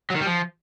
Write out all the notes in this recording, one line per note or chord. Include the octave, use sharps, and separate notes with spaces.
F#3
D#3
G3
F3